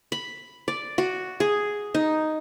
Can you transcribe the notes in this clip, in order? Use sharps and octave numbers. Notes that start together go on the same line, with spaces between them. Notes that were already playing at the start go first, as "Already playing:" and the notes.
B5
D5
F#4
G#4
D#4